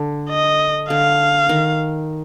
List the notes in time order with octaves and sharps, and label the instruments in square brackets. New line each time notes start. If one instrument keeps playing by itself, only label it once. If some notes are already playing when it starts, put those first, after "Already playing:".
Already playing: [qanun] D3
[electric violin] D#5
[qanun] D3 [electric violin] F5
[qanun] D#3